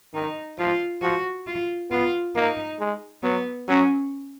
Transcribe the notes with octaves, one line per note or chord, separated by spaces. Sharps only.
D#3 D#4
F3 F4
F3 F#4
F4
B3 F4
A#3 D#4
G#3
F#3 B3
F#3 C#4